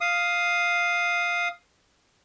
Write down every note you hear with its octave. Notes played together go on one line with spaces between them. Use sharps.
F5 D#6